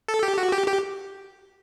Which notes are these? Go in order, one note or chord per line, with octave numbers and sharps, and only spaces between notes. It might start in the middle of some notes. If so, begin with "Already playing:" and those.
A4
G4
F#4
G4
G4